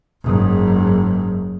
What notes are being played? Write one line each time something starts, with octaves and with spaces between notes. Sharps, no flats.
F#1 G#2